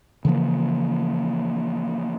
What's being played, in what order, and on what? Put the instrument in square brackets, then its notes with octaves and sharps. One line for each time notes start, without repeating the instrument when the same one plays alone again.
[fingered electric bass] C#3 E3 F3 A#3